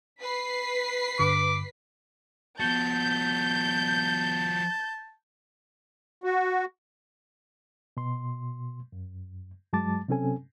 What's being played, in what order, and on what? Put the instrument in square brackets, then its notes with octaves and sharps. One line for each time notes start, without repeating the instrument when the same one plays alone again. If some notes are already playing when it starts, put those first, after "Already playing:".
[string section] B4 B6 C7
[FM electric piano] G2 D3 [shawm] D6
[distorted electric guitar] F3 F#4 [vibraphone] B3 [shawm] A5 [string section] G6
[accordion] F#4
[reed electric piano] B2 C6
F#2
G2 F#3 G#3 A5 D6 A6
C3 F#3 C4 C#4 A4 G#5